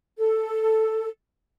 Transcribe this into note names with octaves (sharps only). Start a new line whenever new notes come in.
A4